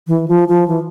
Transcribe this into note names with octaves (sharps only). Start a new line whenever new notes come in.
E3
F3
F3
E3